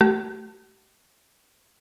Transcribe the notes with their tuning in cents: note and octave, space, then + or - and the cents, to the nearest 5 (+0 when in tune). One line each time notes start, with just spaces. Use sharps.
A3 +0 G4 -45